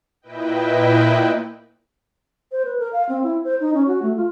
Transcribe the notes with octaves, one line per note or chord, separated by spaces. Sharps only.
A#2 E4 B4 D#5 G5
C5
B4
A#4
F5
C4
E4
C5
D#4
C#4
F#4
A3
F4